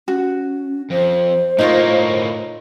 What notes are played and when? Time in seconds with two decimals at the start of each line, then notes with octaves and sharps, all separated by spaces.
0.08 C#4 F#4
0.91 F2 C5
1.59 A2 A#3 D#4 F4 C#5